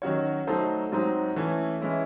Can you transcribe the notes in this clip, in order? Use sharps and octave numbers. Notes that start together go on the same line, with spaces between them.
D#3 F#3 C#4 F#4 C#5
F#3 A3 D#4 A4 C5
G#2 F#3 C4 D#4
E3 A3 C#4 E4
E3 G#3 C#4 E4